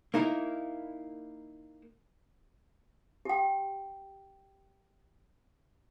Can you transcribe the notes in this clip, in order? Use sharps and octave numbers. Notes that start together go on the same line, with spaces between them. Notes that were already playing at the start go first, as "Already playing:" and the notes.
A#3 D#4 E4 A#4
G4 G5